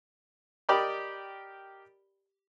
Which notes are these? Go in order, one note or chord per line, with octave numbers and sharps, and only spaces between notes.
G4 A#4 D5 D#5 G5 B5